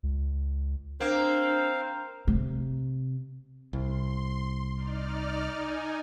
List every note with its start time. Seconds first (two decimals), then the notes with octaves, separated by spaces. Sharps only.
0.03 C#2
1.00 A#3 C4 D4 C5 F5
2.27 C3
3.73 C2 C6
4.76 D#4 D5 F6
5.49 D#4 G#5